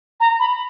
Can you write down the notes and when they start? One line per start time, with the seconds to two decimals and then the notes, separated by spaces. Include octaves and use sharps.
0.20 A#5
0.39 B5